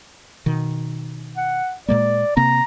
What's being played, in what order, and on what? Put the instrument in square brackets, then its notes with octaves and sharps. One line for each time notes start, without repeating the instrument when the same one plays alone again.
[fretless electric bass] B2 D#3
[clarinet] F#5
[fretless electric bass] A#2 G#3 A#3 [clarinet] D5
[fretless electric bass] C3 A#3 C4 [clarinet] A#5